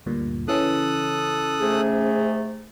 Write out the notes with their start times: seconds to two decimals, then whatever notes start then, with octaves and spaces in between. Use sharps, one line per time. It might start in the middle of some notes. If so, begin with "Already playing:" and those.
0.06 D2 G2 A#2
0.48 C#3 E3 C#4 A4 D#6 F#6
1.61 G#2 C3 A3 G#4